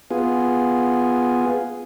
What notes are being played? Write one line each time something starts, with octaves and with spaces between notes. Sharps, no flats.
B3 F4 G#4